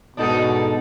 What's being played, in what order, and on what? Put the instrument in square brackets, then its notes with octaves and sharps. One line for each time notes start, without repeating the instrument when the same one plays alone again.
[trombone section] G#2 B2 [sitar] D4 D#4 A4